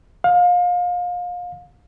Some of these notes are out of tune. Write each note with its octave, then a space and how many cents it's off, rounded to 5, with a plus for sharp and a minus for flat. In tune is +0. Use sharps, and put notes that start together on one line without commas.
F5 +30